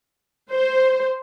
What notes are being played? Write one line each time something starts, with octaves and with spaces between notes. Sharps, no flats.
C5